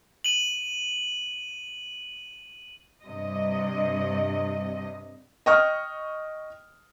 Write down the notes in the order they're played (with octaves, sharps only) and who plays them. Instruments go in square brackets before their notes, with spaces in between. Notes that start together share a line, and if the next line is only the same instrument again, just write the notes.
[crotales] D#7 F#7
[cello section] G2 C3 D#5
[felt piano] D#5 G5 C#6 D#6 F6